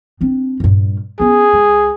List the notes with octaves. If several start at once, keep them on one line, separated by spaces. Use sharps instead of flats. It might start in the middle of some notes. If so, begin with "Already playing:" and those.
C4 D4
G2 A#2
B3 C#4 G#4
C#2